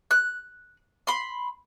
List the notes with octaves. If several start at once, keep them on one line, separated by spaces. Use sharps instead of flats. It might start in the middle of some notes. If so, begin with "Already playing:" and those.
F#6
B5 C6